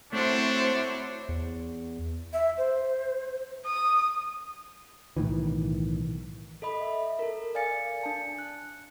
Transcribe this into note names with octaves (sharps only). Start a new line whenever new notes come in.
A3 C4 D4 E4 F#4 C5 C#5
E2
E5
C5
D#6
B1 A2 D#3 E3
A4 D#5 B5
E5
A4 A#4
D5 F5 G#5 A6 C#7
D4 A5 C#7
F#6